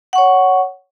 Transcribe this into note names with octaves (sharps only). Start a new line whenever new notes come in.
C#5 F#5 C#6